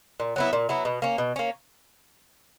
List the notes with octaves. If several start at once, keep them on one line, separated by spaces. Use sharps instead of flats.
A#2
F#3 B3 E4
A#2
F#3 B3 E4
B2
A#3 C#4
B2
A#3 C#4